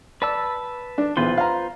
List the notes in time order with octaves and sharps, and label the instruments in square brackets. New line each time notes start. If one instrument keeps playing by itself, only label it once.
[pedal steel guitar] B4 A5 E6 [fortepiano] D5
[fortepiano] D4
[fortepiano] B1 E2 [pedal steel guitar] F4 B4 C5
[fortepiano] F5 A#5